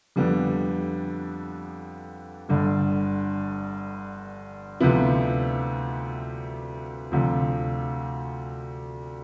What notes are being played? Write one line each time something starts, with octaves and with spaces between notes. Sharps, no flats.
F2 D3 G3 B3
G1 G2 D3
D2 C3 F3 B3 E4
D2 C3 F3